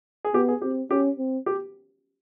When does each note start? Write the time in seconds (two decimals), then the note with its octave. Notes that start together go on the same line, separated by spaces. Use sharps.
0.25 G#4
0.34 B3 G4
0.48 G#4
0.62 C4 G4
0.91 C#4 G4
1.18 C4
1.46 G4